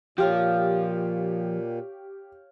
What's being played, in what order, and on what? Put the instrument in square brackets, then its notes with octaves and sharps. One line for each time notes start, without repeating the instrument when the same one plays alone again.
[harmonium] A#2 [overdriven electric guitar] F3 [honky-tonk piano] G4 [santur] C#5 F5 G5